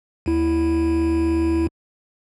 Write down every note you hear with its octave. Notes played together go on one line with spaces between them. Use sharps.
D#2 E4